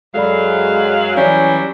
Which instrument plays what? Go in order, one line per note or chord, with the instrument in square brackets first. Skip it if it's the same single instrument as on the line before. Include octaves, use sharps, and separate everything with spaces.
[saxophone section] F#2 F#3 F5 [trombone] G#3 [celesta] A4 D5 B5
[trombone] E3 [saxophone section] F#3 G3 E4 [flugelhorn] C#4 [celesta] D5